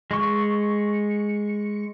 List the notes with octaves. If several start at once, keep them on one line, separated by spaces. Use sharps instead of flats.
G#3 C#6